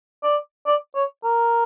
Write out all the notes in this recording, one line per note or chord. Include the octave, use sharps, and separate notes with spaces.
D5
D5
C#5
A#4